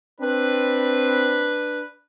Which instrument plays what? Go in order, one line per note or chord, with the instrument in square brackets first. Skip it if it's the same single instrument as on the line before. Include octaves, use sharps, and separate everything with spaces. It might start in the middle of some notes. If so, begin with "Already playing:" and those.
[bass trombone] C4 [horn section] D4 B4